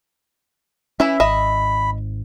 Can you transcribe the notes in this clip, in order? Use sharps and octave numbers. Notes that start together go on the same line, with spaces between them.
E3 C#4 E4 E5 B5
G#1 D#5 E5 B5